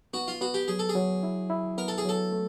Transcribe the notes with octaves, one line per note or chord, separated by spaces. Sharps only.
B3 F#4
F4
B3 F#4
G4
F#3 G#4
A4
G#4
F#3
E4
E4
B3 A#4
A4
G#4
F#3 A4
A3